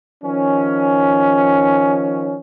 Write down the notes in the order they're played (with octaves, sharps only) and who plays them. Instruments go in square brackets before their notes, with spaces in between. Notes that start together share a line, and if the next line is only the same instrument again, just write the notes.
[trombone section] D#3 F3 C#4